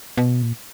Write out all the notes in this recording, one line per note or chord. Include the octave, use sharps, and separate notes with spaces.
B2
A#2